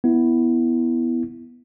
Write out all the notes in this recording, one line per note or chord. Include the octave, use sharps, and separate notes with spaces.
B3 E4